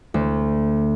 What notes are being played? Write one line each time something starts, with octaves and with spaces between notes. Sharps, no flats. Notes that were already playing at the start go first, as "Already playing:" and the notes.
D2